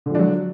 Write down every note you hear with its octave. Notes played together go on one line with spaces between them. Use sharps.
D3 F3 F#3 D4